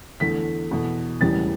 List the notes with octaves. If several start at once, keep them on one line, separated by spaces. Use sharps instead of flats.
E2 D3 A3 B6
E2 B2 A3
E1 E2 C#3 E3 G3 A6